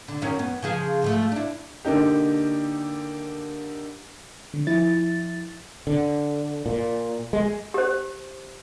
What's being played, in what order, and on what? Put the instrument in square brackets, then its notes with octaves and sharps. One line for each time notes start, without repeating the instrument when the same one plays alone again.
[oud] D3
F#2 D#3 C#4
B3
C#3 F3 G#4
G#2 F3 A3
D4 E4
[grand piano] D3 A#3 D#4 G4
[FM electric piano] D3
F3 E4 A6
[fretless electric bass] D3
A#2
G#3
[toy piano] G4 C5